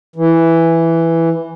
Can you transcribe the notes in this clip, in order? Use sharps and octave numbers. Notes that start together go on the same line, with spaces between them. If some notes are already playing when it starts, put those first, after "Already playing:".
E3